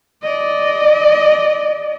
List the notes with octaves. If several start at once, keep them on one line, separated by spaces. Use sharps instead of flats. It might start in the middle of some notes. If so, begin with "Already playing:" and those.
D5 D#5